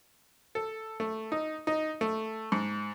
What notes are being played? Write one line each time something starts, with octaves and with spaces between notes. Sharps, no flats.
A4
A3
D#4
D#4
A3
G#2